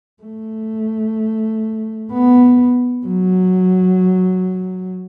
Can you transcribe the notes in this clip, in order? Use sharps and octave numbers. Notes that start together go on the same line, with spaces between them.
A3
B3
F#3